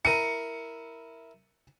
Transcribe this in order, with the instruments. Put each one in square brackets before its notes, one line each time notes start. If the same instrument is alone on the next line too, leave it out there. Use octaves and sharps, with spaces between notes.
[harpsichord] E4 A#4 [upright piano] C#7 D#7